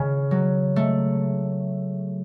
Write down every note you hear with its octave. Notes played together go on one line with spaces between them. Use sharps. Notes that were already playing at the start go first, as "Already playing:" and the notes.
Already playing: C#3
F#3
A3